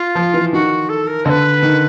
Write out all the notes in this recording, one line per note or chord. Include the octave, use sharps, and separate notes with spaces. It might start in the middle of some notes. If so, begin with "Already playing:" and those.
Already playing: F4
F3
E3
D#3 F#4
A4
A#4
D3 B4 D#5
D#3